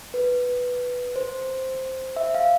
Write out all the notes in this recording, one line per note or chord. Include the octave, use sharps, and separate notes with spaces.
B4
C5
E5
F5